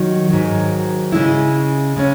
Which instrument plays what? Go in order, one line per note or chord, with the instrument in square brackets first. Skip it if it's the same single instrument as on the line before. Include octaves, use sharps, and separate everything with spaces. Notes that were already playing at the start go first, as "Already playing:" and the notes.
Already playing: [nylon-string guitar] D#3 F#3
G#2 D#3 F#3
C#3 G#3 C#4 E4
C#3 G#3 C#4